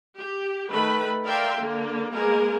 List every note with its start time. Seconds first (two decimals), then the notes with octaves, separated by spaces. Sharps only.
0.18 G4
0.71 D#3 A3 B4 B5
1.26 A#4 D5 E5 F5 G5 C6
1.60 D3 A#3
2.13 G#3 A#3 B3 G#4 A#4